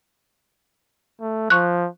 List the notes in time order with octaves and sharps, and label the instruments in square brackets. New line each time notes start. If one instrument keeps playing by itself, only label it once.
[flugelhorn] A3
[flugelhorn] F3 [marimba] C#6 F#6